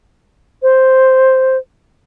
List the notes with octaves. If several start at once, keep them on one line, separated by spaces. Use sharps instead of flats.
C5